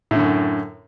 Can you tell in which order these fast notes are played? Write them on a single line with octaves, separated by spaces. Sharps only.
A2 D3 F#2